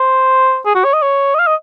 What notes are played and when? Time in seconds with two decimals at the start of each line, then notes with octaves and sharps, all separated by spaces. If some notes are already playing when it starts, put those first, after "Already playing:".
Already playing: C5
0.66 G#4
0.75 F#4
0.84 C#5
0.93 D#5
1.02 C#5
1.34 D#5
1.39 F5
1.47 D#5